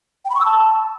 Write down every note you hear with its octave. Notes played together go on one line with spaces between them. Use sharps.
G5
B5
C#6
E6
A5